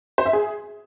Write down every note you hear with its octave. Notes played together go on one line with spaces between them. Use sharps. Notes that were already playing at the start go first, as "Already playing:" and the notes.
C5
E5
G#4